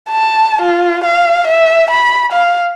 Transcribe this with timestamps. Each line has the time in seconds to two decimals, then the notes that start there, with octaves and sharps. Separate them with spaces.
0.11 A5
0.62 F4
1.04 F5
1.48 E5
1.91 B5
2.33 F5